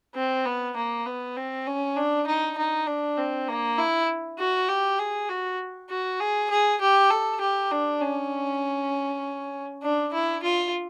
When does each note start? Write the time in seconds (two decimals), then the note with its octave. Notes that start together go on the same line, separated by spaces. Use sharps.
0.16 C4
0.46 B3
0.77 A#3
1.06 B3
1.37 C4
1.67 C#4
1.97 D4
2.27 D#4
2.58 D#4
2.87 D4
3.18 C4
3.48 A#3
3.78 E4
4.39 F#4
4.69 G4
4.99 G#4
5.29 F#4
5.90 F#4
6.20 G#4
6.50 G#4
6.81 G4
7.11 A4
7.41 G4
7.71 D4
8.01 C#4
9.83 D4
10.13 E4
10.43 F4